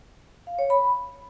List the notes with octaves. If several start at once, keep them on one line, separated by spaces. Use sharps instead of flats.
F5
C#5
B5